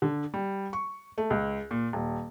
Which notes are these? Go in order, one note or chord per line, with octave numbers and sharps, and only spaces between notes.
D3
G3
C#6
A3
C#2
A#2
D#1